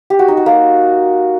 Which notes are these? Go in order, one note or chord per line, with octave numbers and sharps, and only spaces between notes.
G4
F#4
D#4
F#4
A#3